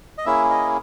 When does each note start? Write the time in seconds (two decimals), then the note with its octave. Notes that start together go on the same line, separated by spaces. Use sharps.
0.18 D#5
0.25 A#3 C#4 E4 G#4 E5
0.50 D#5